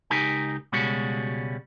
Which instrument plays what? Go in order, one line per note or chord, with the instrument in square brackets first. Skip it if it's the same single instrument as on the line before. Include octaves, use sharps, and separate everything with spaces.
[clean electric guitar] C#2 D#4 G4 A#4 G#5
C#2 B2 G3 G#3 C#4 F#4